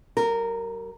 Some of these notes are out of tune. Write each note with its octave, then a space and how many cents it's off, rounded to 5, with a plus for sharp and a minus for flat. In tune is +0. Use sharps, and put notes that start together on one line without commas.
G3 -45 A#4 -15